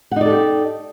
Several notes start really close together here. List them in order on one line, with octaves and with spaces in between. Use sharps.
F#5 D#4 D5 A4 G4